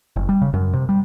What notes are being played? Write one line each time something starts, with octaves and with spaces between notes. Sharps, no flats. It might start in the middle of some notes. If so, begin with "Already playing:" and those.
F#1
G3
C#3
F#2
C3
G3